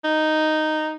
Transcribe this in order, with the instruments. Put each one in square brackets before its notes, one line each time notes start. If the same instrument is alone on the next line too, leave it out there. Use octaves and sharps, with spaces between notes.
[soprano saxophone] D#4